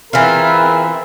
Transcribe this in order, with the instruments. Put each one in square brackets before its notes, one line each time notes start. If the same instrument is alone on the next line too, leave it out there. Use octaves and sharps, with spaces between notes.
[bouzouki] E3 F4 [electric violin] C4 E5 [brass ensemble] G#4 A#4 B4